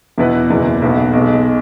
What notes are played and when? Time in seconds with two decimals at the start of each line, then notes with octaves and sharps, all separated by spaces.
0.18 E2 B2 B3 E4 B4
0.50 F#1 E2 B2
0.82 B1 B2 B3
1.13 B1 B2 G#3